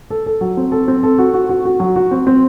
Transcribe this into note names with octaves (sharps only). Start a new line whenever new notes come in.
A4
A4
F#3
C4
A4
C4
A4
F#4
F#4
F#4
F#4
F#3
F#4
C4
C4